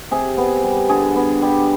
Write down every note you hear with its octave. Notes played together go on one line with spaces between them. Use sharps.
C3 G#4
B3
G3
D3 G#4
B3
G3